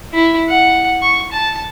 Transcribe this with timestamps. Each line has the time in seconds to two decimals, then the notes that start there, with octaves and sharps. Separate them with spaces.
0.14 E4
0.49 F#5
1.02 C#6
1.32 A5